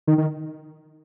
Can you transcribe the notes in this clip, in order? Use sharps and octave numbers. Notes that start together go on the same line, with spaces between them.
D#3
D#3